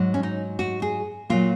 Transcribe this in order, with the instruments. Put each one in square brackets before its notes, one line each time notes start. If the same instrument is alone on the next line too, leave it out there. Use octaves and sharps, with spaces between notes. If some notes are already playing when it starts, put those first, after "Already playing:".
Already playing: [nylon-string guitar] G#2 F#3
C#4
D#4
F#4
G#4
A#2 F#3 F4